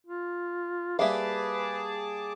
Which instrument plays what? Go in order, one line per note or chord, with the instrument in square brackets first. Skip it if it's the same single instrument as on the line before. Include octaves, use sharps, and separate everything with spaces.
[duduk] F4
[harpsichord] G3 A#3 [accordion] G#4 A5 D6 [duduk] B4 [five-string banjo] E5 F5